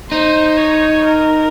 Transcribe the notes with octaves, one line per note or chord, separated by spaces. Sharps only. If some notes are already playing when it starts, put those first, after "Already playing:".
D#4 C5
C#5
A#4